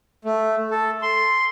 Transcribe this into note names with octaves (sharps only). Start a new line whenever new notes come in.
A3
A4
C6